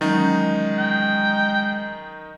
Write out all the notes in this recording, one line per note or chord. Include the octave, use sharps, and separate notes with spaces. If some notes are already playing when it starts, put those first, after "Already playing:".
D#3 E3 F#3 G#3 C#4 D#4
G5